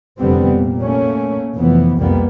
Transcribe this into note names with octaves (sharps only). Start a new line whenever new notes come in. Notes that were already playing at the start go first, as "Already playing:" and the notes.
F1 D#2 D3 G3 B3 C4
A#2
A3 A#3 C#4
F1 E3 F3 B3
C2 F2 G3 A#3 B3